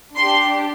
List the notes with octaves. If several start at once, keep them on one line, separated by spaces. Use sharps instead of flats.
D4 G4 C6